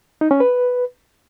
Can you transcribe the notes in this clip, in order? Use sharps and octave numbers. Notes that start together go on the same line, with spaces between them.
D#4
C#4
B4